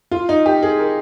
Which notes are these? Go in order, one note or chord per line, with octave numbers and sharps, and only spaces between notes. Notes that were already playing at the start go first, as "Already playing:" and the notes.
F4
D#4
G4
G#4
A#4